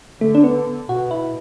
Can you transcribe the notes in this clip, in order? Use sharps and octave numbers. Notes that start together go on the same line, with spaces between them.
D3 A3
D4
B3
B2 F#4
E4